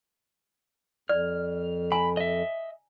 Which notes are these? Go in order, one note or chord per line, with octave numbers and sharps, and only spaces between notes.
F2 D5 F6
G#5 A#5 B5
D#5 E5